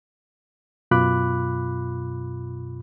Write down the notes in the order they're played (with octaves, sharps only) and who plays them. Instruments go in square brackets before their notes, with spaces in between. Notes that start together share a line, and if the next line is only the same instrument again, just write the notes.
[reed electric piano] F#2 B2 F4 B5 D6 F#6